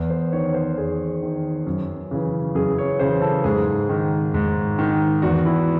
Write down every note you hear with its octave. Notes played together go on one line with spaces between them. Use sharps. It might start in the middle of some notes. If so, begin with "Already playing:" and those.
Already playing: E2
C5
D#3 C#5
C5
E2 G#4
D#3
F#2
C#3 E3
F#2 G#4
C#5
C#3 E3 C5
A4
G#2 G#4
D#3
G#2
D#3
E2 F#4
E4